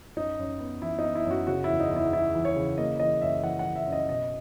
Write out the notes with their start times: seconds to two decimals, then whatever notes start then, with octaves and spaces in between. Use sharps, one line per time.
0.16 F#2 D#4
0.39 F#2
0.60 B3
0.82 E3 E4
0.99 D#4
1.04 B3
1.15 E4
1.26 F#2 F#4
1.47 C#3 F#4
1.64 E2 E4
1.80 D#4
1.91 E2
1.96 E4
2.13 C#3 E4
2.35 E3
2.45 C#5
2.56 C#3
2.78 A#3 D#5
3.00 E3 D#5
3.21 F#2 E5
3.43 E3 F#5
3.59 F#5
3.64 F#2
3.76 E5
3.87 F#2
3.92 D#5
4.09 B2 D#5